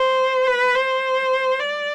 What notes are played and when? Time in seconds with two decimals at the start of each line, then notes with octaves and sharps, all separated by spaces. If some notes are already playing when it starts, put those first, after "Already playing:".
Already playing: C5
0.47 B4
0.75 C5
1.59 D5